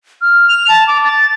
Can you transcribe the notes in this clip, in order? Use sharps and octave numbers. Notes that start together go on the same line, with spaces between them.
F6
F7
A5
D6
A6